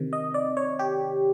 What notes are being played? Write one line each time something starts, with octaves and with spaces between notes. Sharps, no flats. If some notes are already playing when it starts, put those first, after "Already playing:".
Already playing: C3 D#3
D#5
D5
C#5
G4